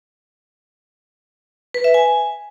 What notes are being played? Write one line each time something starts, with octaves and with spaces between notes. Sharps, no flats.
B4
E5
G#5